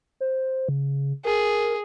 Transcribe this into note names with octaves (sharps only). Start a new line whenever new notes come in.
C5
C#3
G#4 A#4